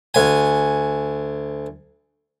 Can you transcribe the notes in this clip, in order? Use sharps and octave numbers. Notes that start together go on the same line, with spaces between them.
D2 G#5